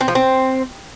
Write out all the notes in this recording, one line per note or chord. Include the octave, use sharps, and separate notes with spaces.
C4
F3
C4